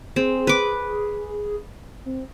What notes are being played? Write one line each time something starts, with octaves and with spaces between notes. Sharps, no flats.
C4 G#4
B4 D6
C4